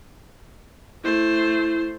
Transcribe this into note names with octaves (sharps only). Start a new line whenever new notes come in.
A3 E4 C5